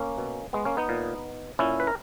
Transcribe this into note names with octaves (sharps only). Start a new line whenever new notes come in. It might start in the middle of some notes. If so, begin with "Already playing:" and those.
Already playing: A#3 C#4
B2
G#3 B3
A#3 C#4
B3 D#4
A#2
A#2 C#4 E4
B4
A#4